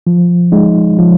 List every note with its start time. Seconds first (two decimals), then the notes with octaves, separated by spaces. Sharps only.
0.07 F3
0.52 G#3 D#4
0.99 F3